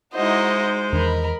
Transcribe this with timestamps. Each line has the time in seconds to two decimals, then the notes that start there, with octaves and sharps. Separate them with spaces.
0.15 G#3 D#4 E4 F#4 C5 D#5
0.92 E2 D#3 D4 A#4 D#5 B5